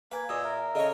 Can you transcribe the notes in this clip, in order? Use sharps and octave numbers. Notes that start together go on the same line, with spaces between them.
A#3 B4 F5 G#5 G#6
A#2 G#4 D#5 E6
A#4 E5
C#3 A4 C#5 D#5